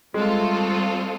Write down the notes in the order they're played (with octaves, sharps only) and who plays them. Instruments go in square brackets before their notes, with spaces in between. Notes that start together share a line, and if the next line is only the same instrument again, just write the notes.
[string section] G3 C4 F4 A4 [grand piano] G#3
[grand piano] A3